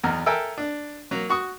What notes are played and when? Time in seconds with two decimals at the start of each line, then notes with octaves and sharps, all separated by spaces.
0.03 B1 E2 A#5 F6
0.26 A4 A#4 E5 G5 G#5 A#5
0.58 D4
1.11 F#3 A#3
1.29 F#4 C#6 D#6